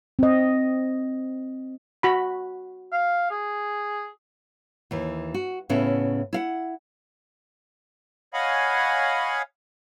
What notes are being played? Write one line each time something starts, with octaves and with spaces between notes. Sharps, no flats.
C4 D#5
F#4 B5
F5
G#4
D#2 E3
F#4
A2 C#3 B3 C#4 E4
E4 F5 F#5
C#5 D#5 F5 F#5 G#5 B5